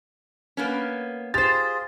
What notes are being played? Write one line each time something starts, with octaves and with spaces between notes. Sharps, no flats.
A#3 B3 C#4
F4 G4 G#4 C5 A6